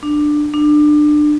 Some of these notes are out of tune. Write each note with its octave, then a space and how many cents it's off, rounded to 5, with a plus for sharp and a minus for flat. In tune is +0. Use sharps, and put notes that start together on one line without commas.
D4 +15
D4 +25